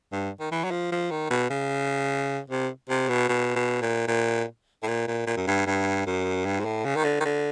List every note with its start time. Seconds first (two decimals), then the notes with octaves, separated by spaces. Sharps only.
0.12 G2
0.40 D#3
0.52 E3
0.64 F#3
0.71 F3
0.92 F3
1.11 D#3
1.30 B2
1.50 C#3
2.50 C3
2.89 C3
3.08 B2
3.29 B2
3.56 B2
3.82 A#2
4.08 A#2
4.83 A2
4.88 A#2
5.07 A#2
5.27 A#2
5.37 F#2
5.47 G2
5.67 G2
6.06 F#2
6.45 G2
6.59 G#2
6.65 A2
6.85 C#3
6.96 D#3
7.04 D3
7.20 D#3
7.25 D3